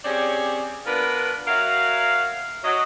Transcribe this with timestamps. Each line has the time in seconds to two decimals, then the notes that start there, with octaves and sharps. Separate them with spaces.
0.05 C4 C#4 G4 G#4 C#5 D5
0.86 B3 D4 F4 A#4 B4
1.47 F#3 F#4 A#4 E5 F5
2.64 F#3 D#5